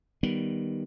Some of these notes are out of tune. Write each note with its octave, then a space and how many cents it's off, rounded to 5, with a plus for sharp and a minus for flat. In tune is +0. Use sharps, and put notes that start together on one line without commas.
D#3 +0 G3 +0 B3 +0